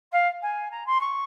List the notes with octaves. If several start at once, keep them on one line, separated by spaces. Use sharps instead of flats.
F5
G#5
A#5
C6
C#6